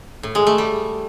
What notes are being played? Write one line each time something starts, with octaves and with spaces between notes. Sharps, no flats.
A2
G#3
A3
G3